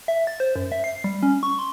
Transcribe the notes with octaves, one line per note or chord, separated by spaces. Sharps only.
E5
A6
C5
F#2
E5
C7
G3
C#4
C#6
C6